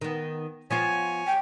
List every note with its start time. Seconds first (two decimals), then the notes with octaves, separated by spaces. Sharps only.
0.01 D#3 B3
0.71 F3 B3 F4 C#5 G#5
1.27 G5